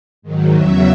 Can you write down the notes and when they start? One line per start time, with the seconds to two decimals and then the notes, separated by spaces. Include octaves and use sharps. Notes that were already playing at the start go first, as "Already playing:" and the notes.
0.22 G#2 D#3 F#3
0.53 E2 C#3 F#3 E5